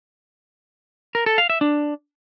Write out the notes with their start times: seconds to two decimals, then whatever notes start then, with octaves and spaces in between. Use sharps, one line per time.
1.15 A#4
1.26 A4
1.38 F5
1.50 E5
1.61 D4